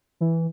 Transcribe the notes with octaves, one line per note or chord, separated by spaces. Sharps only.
E3